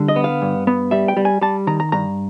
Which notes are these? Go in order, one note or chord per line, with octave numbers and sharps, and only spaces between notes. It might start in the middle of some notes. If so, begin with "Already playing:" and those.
Already playing: D3 G3
D#5
B3
F5
G2
B3
G3 E5
G5
G3
G#5
G3 A5
D#3 A#5
A#5
G2 A#5